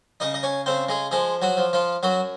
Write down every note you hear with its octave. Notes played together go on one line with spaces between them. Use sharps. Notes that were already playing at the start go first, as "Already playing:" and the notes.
C#3 D#4 D#5
D#5
C#4 C#5
C#3 C4 C5
G#3 G#4
F3 G#3 G#4
F#3 F#4
F3
F3 F4
F#2 F#3 F#4